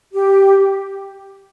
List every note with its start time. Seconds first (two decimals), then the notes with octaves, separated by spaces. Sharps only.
0.13 G4